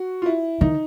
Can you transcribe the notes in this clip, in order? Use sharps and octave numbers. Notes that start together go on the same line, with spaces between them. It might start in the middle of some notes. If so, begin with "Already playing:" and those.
Already playing: F#4
F4
E4
D#3 D#4